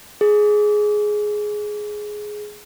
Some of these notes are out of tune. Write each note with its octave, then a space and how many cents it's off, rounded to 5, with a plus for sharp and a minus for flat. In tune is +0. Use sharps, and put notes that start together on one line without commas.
G#4 +10